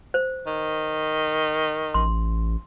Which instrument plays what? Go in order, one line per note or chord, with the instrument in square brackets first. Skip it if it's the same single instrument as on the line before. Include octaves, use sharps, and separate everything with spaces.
[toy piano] C5
[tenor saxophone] D#3
[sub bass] A1 [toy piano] C6